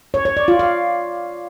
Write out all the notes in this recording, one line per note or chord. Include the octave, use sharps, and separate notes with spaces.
C#5
C#5
D5
F4
F5